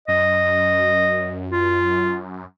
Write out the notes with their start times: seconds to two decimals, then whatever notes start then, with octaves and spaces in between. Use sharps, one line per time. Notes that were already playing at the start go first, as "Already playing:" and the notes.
0.08 F#2 D#5
1.51 F4